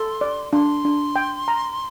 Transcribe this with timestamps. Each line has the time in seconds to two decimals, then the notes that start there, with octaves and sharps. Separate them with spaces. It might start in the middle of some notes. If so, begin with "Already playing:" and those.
Already playing: A4 C6
0.21 D5
0.53 D4 C6
0.85 D4
1.16 G5
1.48 A#5